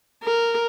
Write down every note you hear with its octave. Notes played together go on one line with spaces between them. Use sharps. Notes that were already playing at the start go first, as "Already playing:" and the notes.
A#4